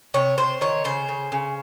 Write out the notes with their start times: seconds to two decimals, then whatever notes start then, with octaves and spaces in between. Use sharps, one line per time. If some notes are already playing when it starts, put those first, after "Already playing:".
0.14 C3 C#5
0.38 C3 C5
0.61 D#3 C#5
0.84 C#3 C5
1.08 C#3
1.32 C#3